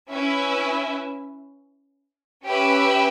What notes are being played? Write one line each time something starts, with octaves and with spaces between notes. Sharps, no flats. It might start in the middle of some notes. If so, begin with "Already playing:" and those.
C#4 E4 B4 E5
C#4 G4 B4 E5